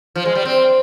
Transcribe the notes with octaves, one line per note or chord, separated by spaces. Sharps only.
F3
G#3
G3
C4